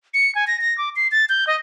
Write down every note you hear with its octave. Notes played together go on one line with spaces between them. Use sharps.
C#7
G#5
A#6
A#6
D6
C7
A6
G6
D#5